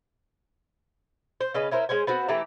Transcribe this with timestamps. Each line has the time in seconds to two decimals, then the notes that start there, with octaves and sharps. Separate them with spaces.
1.41 C5
1.54 C#3 C#4 B4 D#5
1.71 C#4 E4 A#4 C5
1.89 G#3 C#4 C5 G#5
2.07 B3 C4 F#4
2.28 E3 A3 G4 A#5